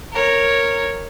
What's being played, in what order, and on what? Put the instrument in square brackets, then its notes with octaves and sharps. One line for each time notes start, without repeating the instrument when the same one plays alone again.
[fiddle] A#4 C#5